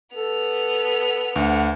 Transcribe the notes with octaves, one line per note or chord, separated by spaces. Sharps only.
B3 A4 F7
D2 F#5